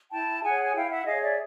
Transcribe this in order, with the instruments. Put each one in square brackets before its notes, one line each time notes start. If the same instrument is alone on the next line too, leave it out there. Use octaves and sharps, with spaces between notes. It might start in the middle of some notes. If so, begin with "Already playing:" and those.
[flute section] E4 G5 A5
G#4 C#5 F#5 G#5
G#5
E4 F5 G5
E5 F#5
G#4 C#5 D#5 F5
D5 E5